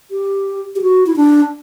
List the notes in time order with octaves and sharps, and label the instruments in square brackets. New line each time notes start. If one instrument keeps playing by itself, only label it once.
[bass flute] G4
G4
F#4
E4
D4